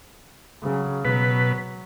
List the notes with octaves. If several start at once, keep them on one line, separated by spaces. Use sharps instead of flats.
C#3 F#3
B2 F#3 B4